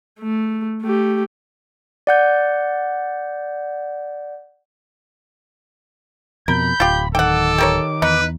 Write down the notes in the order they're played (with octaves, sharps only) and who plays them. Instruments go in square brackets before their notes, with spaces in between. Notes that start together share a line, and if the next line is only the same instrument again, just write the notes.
[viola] A3
A3 G4
[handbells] D5 F#5 G6
[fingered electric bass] F2 B2 [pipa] A#4 [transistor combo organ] B5 [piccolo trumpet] G6
[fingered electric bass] D1 [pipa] F4 G4
[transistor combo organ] D#3 D6 [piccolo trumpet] A4 [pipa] F#5 G5
[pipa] G4 A#4 C#5
[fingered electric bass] E2 [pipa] D#4 [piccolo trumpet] B4